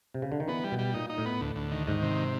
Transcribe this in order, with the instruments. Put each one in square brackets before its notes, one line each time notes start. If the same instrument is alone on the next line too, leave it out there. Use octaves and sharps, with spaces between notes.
[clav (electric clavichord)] C3
C#3
D3
D#3
[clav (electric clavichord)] E3 [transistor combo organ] B3
[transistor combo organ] G3
[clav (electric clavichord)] B2
[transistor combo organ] G3
[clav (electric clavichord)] A#2 [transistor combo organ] D#4
[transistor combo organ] D#4
[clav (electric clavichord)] A2
[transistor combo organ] B3
D2
D2
D#3
[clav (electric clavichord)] G#2 [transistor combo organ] D#3
[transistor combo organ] C3